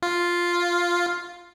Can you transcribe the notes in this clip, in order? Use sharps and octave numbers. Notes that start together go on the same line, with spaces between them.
F4